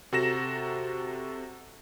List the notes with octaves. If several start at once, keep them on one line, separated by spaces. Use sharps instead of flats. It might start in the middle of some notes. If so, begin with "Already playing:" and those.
C3 F#4 A4 A#5 A#6 E7